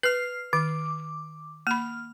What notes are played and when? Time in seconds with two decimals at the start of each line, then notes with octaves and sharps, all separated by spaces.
0.03 B4 F6 C7
0.53 D#3 D6
1.67 A#3 B5 F6